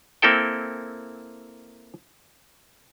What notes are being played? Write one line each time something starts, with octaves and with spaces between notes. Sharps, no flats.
A#3 C4 E4 A4 G5